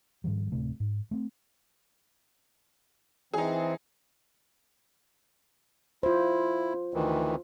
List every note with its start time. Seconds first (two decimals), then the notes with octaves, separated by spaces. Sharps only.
0.24 G#2 D#3 F3 G3
0.52 D1 C3 A3
0.80 G#2
1.11 A3 C4
3.34 E3 C4 D#4 G#4
6.03 E4 F4 C5
6.94 D2 D#3 E3